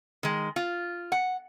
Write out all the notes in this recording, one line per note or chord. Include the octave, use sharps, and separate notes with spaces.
D#3 G#3
F4
F#5